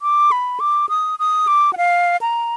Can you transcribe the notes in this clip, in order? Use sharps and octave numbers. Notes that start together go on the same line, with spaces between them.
D6
B5
D6
D#6
D#6
D6
F#5
F5
A#5